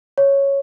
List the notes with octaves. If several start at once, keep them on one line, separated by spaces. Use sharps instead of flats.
C#5